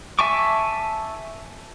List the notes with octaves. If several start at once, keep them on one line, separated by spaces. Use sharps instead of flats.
E5 G#5 A5 C#6 D6